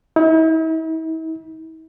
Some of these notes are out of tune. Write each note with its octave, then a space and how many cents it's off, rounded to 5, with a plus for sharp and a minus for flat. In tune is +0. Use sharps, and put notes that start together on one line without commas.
E4 -45